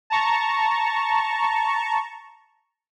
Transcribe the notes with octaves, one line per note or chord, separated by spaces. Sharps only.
A5 A#5 C#6